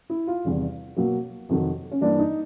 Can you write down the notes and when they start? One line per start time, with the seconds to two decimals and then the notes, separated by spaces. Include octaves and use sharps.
0.10 E4
0.27 F4
0.45 E2 C3 D#3 G3
0.97 B2 F#3 A#3
1.49 F2 C3 D#3 F#3
1.92 C#4
2.01 G2 E3 G3 A#3 D4
2.19 D#4